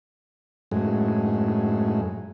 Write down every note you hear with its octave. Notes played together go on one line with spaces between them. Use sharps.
F#2 A2 G#3